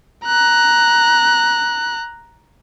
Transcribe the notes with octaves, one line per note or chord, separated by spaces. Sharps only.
A#5 F#6